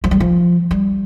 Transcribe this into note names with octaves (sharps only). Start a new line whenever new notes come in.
F3
G3
F3
G3